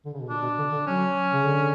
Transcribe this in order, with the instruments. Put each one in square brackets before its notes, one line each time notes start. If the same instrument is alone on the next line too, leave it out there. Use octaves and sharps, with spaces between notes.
[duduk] D3
C#3
B2
[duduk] A#2 [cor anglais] D4
[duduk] B2
D3
D3
[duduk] F#3 [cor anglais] C#4
[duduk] C#3
D3